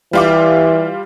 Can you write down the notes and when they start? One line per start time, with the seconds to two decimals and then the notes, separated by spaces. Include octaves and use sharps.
0.13 E3 G3 F4 D6